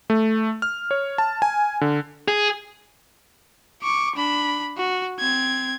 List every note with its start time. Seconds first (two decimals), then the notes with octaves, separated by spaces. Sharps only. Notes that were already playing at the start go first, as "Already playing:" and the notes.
0.10 A3
0.62 F6
0.91 C#5
1.18 A5
1.42 G#5
1.81 D3
2.28 G#4
3.83 C#6 D6
4.16 D4 B5
4.77 F#4
5.19 C4 G#6